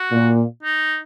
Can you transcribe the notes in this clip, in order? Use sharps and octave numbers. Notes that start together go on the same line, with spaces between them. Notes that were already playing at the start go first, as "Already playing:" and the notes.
Already playing: F#4
A#2
D#4